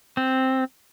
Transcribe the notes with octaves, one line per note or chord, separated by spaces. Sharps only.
C4